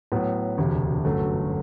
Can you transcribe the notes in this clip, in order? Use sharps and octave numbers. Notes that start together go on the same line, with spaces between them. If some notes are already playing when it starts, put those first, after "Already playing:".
A2 F#3 B3
E1 D2 C3
G1 F#2 F#3 A3